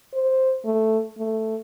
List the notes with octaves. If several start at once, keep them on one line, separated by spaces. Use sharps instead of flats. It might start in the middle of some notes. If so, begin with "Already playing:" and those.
C5
A3
A3